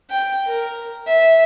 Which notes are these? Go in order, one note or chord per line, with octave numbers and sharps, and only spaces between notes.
G5
A#4
E5